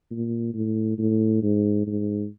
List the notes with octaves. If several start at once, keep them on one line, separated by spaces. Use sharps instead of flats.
A#2
A2
A2
G#2
G#2